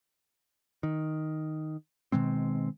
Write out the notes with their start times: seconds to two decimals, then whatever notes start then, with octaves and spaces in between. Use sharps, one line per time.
0.83 D#3
2.12 B2 D#3 G#3 C4